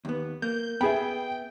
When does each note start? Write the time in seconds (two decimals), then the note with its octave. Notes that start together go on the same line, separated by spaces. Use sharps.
0.05 D#2 B3
0.42 A#3 G6
0.81 B3 G#4 E5 G5 B5